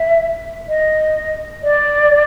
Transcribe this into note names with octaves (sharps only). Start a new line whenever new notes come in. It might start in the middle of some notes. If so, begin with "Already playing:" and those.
Already playing: E5
D#5
D5